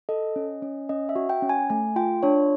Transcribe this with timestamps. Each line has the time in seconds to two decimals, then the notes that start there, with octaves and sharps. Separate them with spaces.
0.09 A4 D#5
0.36 C#4
0.62 C#4
0.89 C#4 D#5
1.09 E5
1.16 F#4
1.29 G5
1.42 C#4
1.49 G#5
1.70 A3 G#5
1.96 F4 G5
2.23 D4 C#5